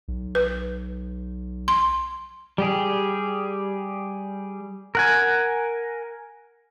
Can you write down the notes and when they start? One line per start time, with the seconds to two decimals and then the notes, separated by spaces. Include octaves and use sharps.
0.08 B1
0.35 B4
1.68 C6
2.58 G3 G4 G#4
4.95 A#4 F#5 G#5